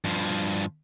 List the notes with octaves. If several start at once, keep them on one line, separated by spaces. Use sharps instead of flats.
G2 F3